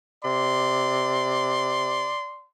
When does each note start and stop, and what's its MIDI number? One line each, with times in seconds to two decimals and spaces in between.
0.25 2.11 48
0.25 2.46 74
0.25 2.46 84